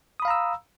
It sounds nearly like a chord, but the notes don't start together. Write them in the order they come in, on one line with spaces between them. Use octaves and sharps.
D#6 B5 F5 A#5 E6